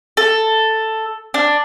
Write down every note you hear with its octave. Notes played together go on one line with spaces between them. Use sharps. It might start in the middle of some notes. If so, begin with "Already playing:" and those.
A4
D4